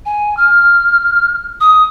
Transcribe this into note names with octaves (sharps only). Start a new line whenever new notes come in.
G#5
F6
D#6